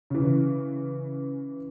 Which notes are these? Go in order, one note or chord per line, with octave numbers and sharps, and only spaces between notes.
C#3 E3